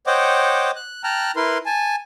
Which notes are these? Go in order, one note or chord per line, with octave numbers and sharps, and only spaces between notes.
C5 C#5 D#5 F#5 G5 D6
F#6
G5 A5 A#5 F6 F#6
E4 A#4 B4 C6
G#5 A5